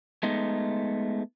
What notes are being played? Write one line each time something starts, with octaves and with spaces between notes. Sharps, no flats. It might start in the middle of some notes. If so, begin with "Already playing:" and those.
G#3 A3 B3 D#4